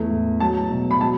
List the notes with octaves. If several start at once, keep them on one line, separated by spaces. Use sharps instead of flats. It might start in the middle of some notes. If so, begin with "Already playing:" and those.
Already playing: E2 A3
A2
F#3 A5
B2
B5
F#3 A5